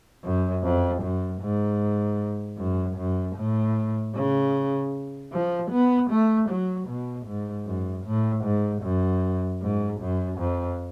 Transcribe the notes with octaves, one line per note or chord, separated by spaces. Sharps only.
F#2
F2
F#2
G#2
F#2
F#2
A2
C#3
F3
B3
A3
F#3
B2
G#2
F#2
A2
G#2
F#2
G#2
F#2
F2